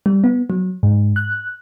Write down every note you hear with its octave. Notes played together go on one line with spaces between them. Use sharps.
G3
B3
F#3
G#2
F#6